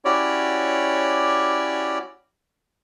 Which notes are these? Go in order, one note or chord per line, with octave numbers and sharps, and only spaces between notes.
C#4 E4 F#4 G4 C#5 D5